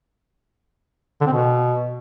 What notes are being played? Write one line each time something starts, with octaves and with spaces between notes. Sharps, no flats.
D3
C4
B2